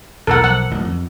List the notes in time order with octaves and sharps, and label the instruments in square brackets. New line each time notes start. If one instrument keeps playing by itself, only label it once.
[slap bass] B1 E2 A2 [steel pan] A4 A#4 F#5
[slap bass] B1 F3 [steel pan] F#5
[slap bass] D1 A1 G2
F2